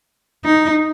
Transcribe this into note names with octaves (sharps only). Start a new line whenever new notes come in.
D#4